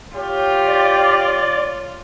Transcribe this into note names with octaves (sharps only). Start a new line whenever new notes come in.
F4 G4 C#5
D5